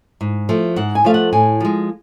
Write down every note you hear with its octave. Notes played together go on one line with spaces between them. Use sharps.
G#2
F3 A3
G#2 F#5
G#5
F3 A3 F5
F#5
A2 G#5
F3 G#3